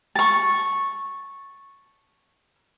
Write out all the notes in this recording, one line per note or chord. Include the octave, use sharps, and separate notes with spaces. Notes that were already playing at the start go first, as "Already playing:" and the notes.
A5 C#6